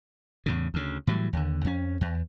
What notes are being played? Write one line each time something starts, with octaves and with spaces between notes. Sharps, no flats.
E2 A2 C#3
D2 C#3
A2 E3 F#3 G3
D#2 D3
F2 C#4
E2